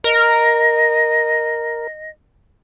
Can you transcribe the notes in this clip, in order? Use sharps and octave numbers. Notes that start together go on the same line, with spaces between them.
A#4 D#5